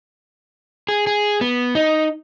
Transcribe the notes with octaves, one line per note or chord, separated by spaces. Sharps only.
G#4
G#4
B3
D#4